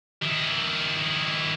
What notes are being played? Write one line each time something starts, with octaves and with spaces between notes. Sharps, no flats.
D#3 E4